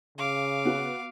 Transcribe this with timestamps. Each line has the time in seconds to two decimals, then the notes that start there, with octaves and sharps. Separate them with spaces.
0.18 C#3 F5 D6
0.65 B3 F#4